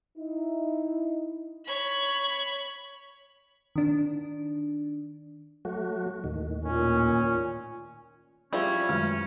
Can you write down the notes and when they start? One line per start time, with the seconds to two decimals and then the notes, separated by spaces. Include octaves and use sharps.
0.17 D#4 E4
1.65 C#5 B5
3.76 D#3 D4
5.65 F#3 A3 F#4
6.24 D#2 A2 D#3
6.65 A#2 C#4
8.53 F3 G3 C#4 E4 F4 G#4
8.89 F#2 D#3 G#3 A3